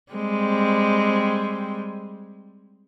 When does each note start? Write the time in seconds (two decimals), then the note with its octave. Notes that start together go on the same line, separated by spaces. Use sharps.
0.13 G3 G#3 C4